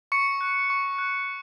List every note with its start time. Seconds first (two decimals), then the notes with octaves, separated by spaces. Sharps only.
0.12 C#6 C#7
0.41 F#6
0.70 C#6
0.98 F#6